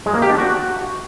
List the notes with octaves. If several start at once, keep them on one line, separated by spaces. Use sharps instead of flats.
G#3
A#3
G4
D4
F#4